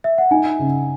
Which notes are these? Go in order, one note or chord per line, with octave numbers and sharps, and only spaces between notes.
E5
F#5
D#4 G#5
C#3